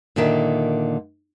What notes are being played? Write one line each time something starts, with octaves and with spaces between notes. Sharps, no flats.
A#2 D3 D#3 E5